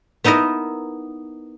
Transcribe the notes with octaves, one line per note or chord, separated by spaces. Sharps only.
B3 D#4 E4 A#4 D#5